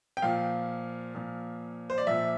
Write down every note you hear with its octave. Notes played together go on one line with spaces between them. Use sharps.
G5
A#2 F3 F5
A#2 F3
C5
D5
A#2 F3 E5